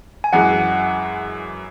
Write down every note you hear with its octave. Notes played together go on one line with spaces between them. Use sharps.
G#5
F#2 E3 G#3 F#5